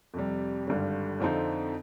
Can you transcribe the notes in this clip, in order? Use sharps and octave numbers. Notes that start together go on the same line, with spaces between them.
F2 C3 G3
G#1 G2 D3 G3
F2 D3 F3 C4 D#4